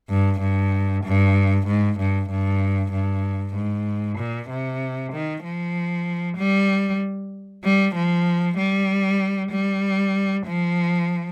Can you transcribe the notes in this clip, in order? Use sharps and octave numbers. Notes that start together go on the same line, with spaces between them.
G2
G2
G2
G#2
G2
G2
G2
G#2
A#2
C3
D#3
F3
G3
G3
F3
G3
G3
F3